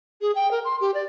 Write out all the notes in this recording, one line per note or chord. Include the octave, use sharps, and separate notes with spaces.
G#4
G5
A#4
C6
G4
D5